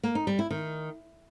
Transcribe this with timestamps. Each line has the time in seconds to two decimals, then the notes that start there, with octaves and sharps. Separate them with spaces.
0.03 A#3
0.15 D#4
0.27 G3
0.39 E4
0.51 D#3